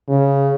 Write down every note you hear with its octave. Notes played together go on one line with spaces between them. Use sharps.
C#3